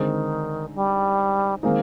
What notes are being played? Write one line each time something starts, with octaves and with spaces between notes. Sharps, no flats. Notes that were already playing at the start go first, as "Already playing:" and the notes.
Already playing: D3 D#3 G#3 C4 D#4
G3
D#3 G#3 A#3 C4 D#4